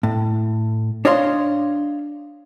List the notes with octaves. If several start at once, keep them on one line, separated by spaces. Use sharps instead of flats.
A2
D4 C#5 D#5 F5 C6